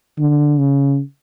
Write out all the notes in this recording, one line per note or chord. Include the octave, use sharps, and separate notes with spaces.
D3
C#3